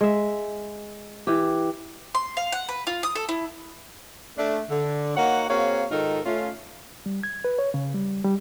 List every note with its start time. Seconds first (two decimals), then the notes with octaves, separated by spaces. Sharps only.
0.01 G#3 E5
1.27 E3 G4
2.15 C6
2.37 F5
2.52 F#5
2.69 B4
2.87 F4
3.03 D#6
3.16 A4
3.29 E4
4.38 A3 D4
4.70 D3
5.16 A#3 D#4 F#4 C#5 F#5
5.50 A#3 C4 F#4 G#4 C#5 F5
5.91 G#2 D#3 D#4 F4 A4 A#4
6.26 A3 C#4 F4
7.06 G3
7.23 G#6
7.44 B4
7.59 C#5
7.74 C#3
7.94 G3
8.24 G3